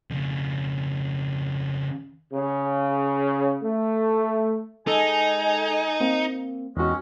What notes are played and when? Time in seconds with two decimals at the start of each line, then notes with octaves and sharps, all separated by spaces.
0.10 F2 C#3
2.33 C#3
3.62 A3
4.87 G#3 D#4 A4 G#5
6.00 A#3 C4
6.77 E2 D#3 G#3 C#4 F#4